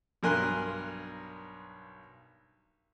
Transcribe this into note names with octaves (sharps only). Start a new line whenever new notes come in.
B1 G2 A#4 G#5 C6 F#6